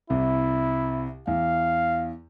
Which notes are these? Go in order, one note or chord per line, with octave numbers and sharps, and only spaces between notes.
C2 C3 E4
E2 F5